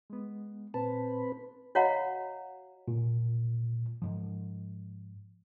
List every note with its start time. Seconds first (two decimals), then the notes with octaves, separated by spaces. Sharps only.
0.10 G#3 B3
0.74 A#2 C4 B4 A5
1.75 F#4 C#5 D#5 F5 F#5 A#5
2.88 A#2
4.02 G#2 F3